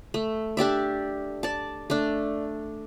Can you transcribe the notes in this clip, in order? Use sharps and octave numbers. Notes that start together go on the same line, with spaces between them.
A3
D4 G4 D5 E5
D5 A5
A3 D4